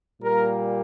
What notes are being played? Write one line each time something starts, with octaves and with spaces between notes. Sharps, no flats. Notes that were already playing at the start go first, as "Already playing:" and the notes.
A#2 G3 A#3 A#4